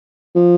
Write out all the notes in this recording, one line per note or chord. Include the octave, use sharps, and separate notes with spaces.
F3